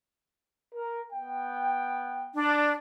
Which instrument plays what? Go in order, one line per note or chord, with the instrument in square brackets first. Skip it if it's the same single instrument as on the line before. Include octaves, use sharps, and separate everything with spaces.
[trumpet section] A#4
B3 G5
[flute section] D4